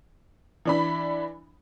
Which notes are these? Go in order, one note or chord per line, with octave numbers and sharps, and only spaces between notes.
E3 D4 B5